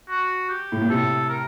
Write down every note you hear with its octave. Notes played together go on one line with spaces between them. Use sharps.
F#4
G4
A2
A#2
A2 C3 A4
A#4